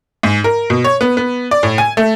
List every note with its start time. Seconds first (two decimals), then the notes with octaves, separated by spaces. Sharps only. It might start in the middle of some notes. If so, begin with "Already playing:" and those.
0.23 G#2
0.44 A#4
0.70 B2
0.84 C#5
1.01 B3
1.17 B3
1.51 D5
1.63 A2
1.78 G#5
1.97 A3